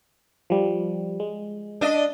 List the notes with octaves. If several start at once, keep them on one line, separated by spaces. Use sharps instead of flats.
F3 G3
G#3
D4 D#5